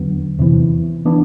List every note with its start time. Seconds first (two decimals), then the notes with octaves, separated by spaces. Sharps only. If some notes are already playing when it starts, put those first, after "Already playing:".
Already playing: E2 D3 F#3 B3
0.39 E2 C3 E3
1.05 E3 B3 D4